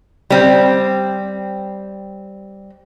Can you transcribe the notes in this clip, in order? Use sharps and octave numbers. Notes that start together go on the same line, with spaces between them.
G3 C4